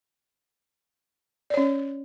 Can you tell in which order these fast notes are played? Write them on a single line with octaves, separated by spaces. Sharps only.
D5 C#5 C#4